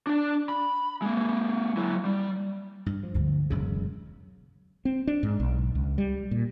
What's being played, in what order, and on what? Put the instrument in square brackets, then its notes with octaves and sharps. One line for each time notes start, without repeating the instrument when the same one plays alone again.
[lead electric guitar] D4 D5
B5
G#3 A#3
F#3 E4
G3
[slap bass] G2
F3
[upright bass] D2 G2
[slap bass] E1 F#2 C#3 [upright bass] F#3
[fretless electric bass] C4
D4
G#2
B1
C#2
G3
A#2